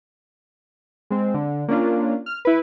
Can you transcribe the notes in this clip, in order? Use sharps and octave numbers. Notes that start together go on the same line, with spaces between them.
G#3 C4
D3
A#3 C#4 D4 F4
F6
E4 B4